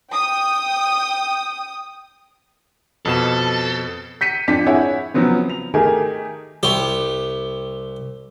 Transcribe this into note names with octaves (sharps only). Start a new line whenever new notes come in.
G5 D#6
F2 B2 A4 E7
G6 B6 C#7 D#7
F2 D4 F4 B6
E4 G#4 C#5 E5 F#5
C#3 F3 F#3 B3 C4
F7
D#3 A3 G4 G#4 A#4
C2 G4